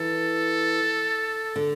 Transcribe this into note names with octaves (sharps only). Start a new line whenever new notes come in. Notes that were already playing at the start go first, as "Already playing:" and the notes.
Already playing: E3 A4
D3